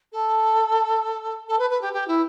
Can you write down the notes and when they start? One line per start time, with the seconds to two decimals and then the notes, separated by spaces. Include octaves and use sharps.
0.12 A4
1.49 A4
1.59 B4
1.70 B4
1.82 G4
1.93 G4
2.08 E4